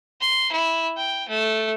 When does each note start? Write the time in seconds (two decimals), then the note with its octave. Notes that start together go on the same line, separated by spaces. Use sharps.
0.21 C6
0.52 E4
0.97 G5
1.28 A3